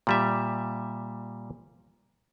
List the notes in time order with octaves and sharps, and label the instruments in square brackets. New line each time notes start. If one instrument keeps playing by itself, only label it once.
[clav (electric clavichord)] A#2 G3 E5